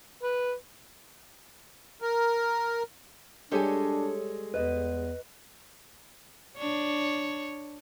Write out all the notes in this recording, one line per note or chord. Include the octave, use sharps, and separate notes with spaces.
B4
A#4
G3 G#3 D4 G4 A4 C#5 G#5
E2 B4 D#5
D4 C#5